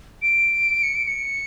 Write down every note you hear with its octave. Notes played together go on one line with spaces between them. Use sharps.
D7
C#7
D7
C#7